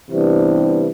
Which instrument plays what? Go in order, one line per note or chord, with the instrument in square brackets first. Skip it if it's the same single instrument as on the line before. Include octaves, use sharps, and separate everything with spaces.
[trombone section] C3 E3 G3 B3 D4